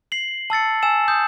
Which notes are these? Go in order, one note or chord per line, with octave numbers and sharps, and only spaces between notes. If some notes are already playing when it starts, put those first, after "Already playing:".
C7 F#7
A5 E6 A6 C#7
G#5 A5 E6 E7
D#6 G6